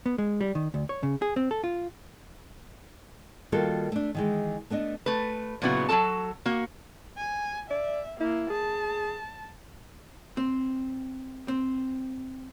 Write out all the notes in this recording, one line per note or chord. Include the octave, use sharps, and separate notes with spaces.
B3
G#3
G3
D#3
D2
C#5
C#3
G#4
C4
A4
F4
D#3 G3 A#3 F4 F#4 A4
A3 D4
D#3 E3 G#3
A3 B3 D4 D#5
A3 B4
A#2 C#3 F#3 B3 E4 F#4
F#3 D#4 F#4 A4 A5
A#3 F#4
G#5
D5 E5
A#3 E4
G#4 A5
C4
C4